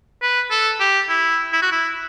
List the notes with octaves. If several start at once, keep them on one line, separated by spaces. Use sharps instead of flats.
B4
A4
G4
E4
E4
F#4
E4